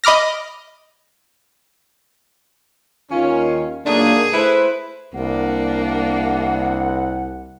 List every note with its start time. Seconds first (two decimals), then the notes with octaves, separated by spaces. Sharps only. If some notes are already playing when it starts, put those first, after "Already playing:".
0.04 D#5 B5 D6 F6 A#6
3.11 D#2 D#3 C#4 F4
3.86 A#2 D3 F#3 A3 A#3 D4 D#4 G#4
4.33 A3 E4 B4 C5
5.15 C2 A#3 D4 F#5